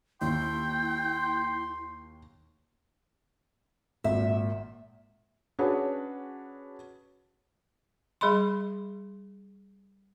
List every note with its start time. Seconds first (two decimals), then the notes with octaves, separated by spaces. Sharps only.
0.21 D#2 E4 G5 C6
4.04 G#1 A#2 E5
5.59 C#4 D4 F#4 G#4 B4 C#5
8.21 G3 G#4 D#5 B5 C6